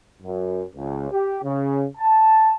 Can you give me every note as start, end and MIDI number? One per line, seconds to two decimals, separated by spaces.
0.23 0.63 42
0.76 1.09 37
1.11 1.40 67
1.43 1.86 49
1.98 2.54 81